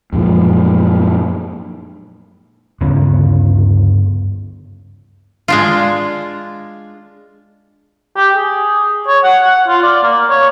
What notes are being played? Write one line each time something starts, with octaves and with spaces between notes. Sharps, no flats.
F#2 A#2 F3 G#3
D2 G2 C#3 B3
G#3 D4 F4
G4
G#4
C#5
F#5
F#5
F4
D5
A#3
C#5